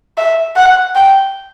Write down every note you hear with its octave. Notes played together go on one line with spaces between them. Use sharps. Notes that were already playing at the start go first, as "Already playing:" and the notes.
E5
F#5
G5